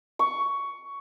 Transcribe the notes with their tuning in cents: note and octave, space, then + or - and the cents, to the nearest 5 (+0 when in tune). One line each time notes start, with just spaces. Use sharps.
C#6 +10